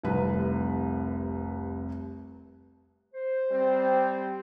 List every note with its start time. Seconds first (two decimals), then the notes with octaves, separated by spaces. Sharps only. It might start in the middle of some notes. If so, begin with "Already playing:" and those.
0.03 F1 C2 B4
3.14 C5
3.52 G3 C4